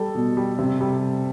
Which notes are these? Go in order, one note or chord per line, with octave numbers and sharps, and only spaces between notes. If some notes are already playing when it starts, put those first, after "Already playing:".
Already playing: G3 A4
B2
G3
C3
G3